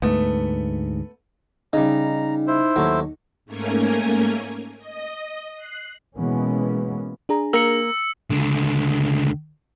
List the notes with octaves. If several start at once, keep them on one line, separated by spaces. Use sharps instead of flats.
D2 G#2 A3 B3
C#3 G3 D#4 A#5
E4 C5
D#2 F#3 A3
G#2 A3 A#3 C#4 A#4 G#5
D#5
F#6 C7
B2 E3 G#3 A#3 B3 C#4
D4 G#4 A#5
A#3 A#4 E6 C#7
C#2 D3